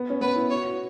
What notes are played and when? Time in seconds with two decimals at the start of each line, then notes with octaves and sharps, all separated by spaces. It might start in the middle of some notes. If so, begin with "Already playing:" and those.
Already playing: B3
0.10 C#4
0.21 B3 B4
0.36 E4
0.50 F#4 C#5
0.63 F#4